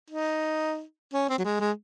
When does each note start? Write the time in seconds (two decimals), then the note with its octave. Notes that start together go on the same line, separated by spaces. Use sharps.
0.10 D#4
1.14 C#4
1.29 C4
1.38 F#3
1.44 G#3
1.60 G#3